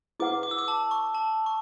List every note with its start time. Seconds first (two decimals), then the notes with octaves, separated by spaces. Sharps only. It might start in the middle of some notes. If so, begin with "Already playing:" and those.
0.20 E4 G#4 B4 F#5 D6
0.43 D6
0.51 E6
0.58 D6
0.68 A5
0.91 C#6
1.14 A5
1.46 C#6